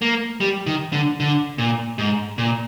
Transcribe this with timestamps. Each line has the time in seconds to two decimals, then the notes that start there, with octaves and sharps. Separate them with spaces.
0.02 A#3
0.41 G3
0.67 D#3
0.92 D3
1.20 D3
1.58 A#2
1.98 G#2
2.38 A#2